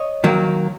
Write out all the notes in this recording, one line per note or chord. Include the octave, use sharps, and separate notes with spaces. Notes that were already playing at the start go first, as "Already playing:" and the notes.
Already playing: C#5 D#5
D#3 F#3 A#3